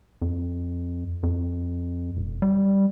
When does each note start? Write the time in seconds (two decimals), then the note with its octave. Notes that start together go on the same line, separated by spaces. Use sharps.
0.21 F2
1.23 F2
2.17 E1
2.42 G3